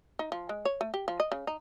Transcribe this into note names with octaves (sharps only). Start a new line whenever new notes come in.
D#4
F3
G#3
C#5
A3
G4
F3
D#5
C#3
D#4